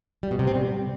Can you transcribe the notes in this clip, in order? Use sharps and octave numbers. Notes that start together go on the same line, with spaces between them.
G3
B2
C3
C4
G3